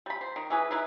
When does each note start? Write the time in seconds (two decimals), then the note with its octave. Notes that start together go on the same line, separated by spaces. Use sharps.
0.06 G3 B5
0.21 C5
0.36 D#3
0.50 E3 G#4 B4
0.71 D#4 E4 B4